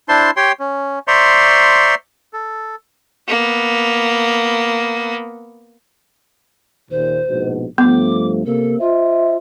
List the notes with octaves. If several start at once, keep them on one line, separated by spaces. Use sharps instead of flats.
D4 E4 C5 A5 C6
G4 C#5 G5 C6
C#4
C5 D5 E5 A#5 C6 C#6
A4
A#3 B3
D#2 A#2 C5
A#1 G#2 B2
G2 F3 A3 B3 D6
C3 A#3 A4
F4 C5 D#5 E5